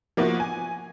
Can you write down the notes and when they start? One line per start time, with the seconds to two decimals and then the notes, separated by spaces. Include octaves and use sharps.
0.17 F3 A#3 B3 E4 F#4
0.40 G#5